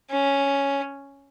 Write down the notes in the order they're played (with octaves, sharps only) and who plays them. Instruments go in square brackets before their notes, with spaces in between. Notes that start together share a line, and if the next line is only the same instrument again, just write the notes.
[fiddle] C#4